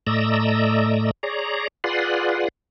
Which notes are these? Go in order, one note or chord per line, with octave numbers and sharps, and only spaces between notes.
A2 A3 D5 D#5 A#5 E6
G#4 C#5 D5 A#5
F4 G#4 B4 D5 F#5 C6